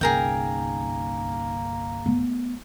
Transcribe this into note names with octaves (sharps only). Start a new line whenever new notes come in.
G1 C2 A#3 C#4 D#4 G#4 A#4 G5
A3 B3